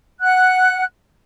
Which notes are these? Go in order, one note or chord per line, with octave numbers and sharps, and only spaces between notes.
F#5 F#6